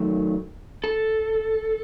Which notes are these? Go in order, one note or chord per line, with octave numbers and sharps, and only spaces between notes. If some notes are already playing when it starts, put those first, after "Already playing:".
Already playing: F#2 D#3 F#3 A3
A4